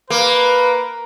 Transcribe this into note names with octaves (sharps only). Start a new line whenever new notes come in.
A#3 B4